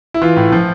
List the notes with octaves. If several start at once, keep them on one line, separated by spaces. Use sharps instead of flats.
E4
E3 F4
A2
F3